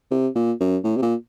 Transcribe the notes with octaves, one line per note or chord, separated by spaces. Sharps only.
C3
A#2
F#2
A2
C3
A#2